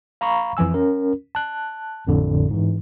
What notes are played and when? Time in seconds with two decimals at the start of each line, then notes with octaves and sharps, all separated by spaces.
0.21 F5 A#5 B5 C#6
0.57 F2 E3 F3 G#5 E6
0.74 C#4 A#4
1.35 A5 F#6
2.07 A1 F2 A2 D3
2.51 G#2 E3